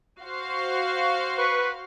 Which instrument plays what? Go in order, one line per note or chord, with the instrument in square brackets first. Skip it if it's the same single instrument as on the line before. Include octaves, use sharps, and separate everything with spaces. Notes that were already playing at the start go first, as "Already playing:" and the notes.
[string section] F#4 C5 F5
[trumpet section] B4 C#6